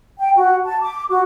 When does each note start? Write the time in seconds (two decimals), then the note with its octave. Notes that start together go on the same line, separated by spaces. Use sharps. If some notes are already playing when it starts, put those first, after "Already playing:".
0.18 G5
0.35 F#4
0.66 A5
0.82 D6
1.09 F#4